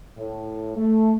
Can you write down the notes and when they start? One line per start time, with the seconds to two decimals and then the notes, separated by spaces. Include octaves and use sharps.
0.18 A2
0.76 A3